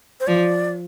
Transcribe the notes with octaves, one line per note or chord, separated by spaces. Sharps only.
C5
F3 D5